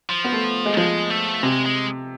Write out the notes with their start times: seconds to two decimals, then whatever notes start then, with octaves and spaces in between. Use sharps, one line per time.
0.10 F3
0.24 B3
0.32 A3
0.66 G#3
0.77 F3 G#3
1.10 A3
1.43 C3 G#3
1.66 G#3